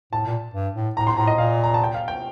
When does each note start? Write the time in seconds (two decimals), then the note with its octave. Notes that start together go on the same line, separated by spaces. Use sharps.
0.12 A2 A5
0.26 A#2
0.54 G2
0.75 A2
0.96 A2 A#5
1.07 C6
1.17 A2 A#5
1.27 D#5
1.38 A#2 F5
1.64 A#5
1.74 A5
1.84 G5
1.94 F5
2.08 G5